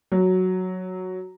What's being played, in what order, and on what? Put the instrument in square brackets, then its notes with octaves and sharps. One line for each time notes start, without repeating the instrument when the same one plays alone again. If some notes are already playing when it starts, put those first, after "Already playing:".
[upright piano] F#3